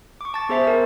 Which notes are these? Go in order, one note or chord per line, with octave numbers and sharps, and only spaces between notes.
C#6 D6
A5 A6
B3 G#4 C5 E5 A5 C7
A#4